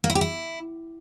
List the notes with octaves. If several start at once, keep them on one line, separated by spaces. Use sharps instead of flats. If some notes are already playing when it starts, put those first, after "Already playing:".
A#3
E4
G4
E4